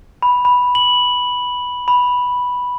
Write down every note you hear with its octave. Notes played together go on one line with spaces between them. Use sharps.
B5
B5
F#7
B5